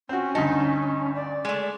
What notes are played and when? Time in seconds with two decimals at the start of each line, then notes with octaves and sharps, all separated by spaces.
0.09 C4 C#4 F#4
0.35 D2 G2 D#4 A5
1.15 D5
1.45 G#3 A3